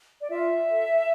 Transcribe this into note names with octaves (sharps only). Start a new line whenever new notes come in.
D5
F4 E5
A4